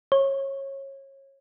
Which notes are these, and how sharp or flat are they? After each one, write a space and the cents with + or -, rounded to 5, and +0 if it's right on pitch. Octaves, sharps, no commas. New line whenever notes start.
C#5 -25